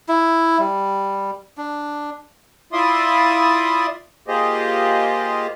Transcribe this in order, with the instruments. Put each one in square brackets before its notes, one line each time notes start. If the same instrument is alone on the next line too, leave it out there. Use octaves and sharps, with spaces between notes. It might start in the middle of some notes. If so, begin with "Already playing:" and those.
[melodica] E4
G3
D4
[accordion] E4 F4 D5 E5 C6 D#6
A#3 F4 G4 G#4 C5 D#5